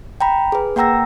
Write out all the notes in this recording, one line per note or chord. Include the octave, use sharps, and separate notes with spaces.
G5 A#5 B5
G#4 B4
A#3 F#5 G5 A#5 E6 A#6